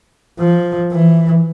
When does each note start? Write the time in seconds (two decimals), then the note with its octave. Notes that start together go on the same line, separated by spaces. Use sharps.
0.39 F3
0.92 E3